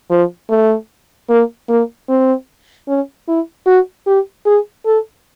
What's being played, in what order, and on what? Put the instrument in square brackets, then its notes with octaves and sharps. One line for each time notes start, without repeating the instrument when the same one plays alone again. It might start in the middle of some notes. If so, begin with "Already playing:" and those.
[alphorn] F3
A3
A#3
A#3
C4
C#4
E4
F#4
G4
G#4
A4